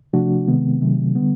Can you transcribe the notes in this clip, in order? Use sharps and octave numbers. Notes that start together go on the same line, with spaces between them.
C3 F3 A3 D4 F#4
C3 D#3 G#3 B3
C3 D#3 F#3 A3
D3 G3 B3